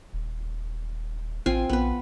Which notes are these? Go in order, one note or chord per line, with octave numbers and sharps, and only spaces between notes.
D#1
A1 C4 F4 G#5
A#1 B3 B4